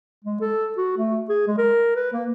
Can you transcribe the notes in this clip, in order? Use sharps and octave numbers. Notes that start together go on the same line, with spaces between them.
G#3
A4
F#4
A3
G#4
G#3
A#4
B4
A#3